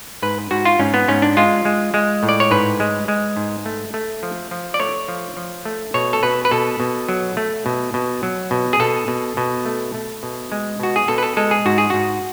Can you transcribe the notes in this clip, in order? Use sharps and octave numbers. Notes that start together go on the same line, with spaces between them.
G#2 B4
G#2 F#4
F4
G#2 C#4
B3
G#2 C#4
D4
G#3 F4
G#3
G#3
A2
D5
C#5
G#2 B4
G#3
G#3
G#2
A3
A3
F3
F3
D5
A3 C#5
F3
F3
A3
B2 C#5
A4
B2 B4
B4
B2 A4
B2
F#3
A3
B2
B2
F#3
B2
G#4
B2 A4
B2
B2
A3
A3
B2
G#3
B2 F#4
G#4
B2 A4
B4
A4
G#3 A4
G#4
G#2 F#4
G#4
G#2 F#4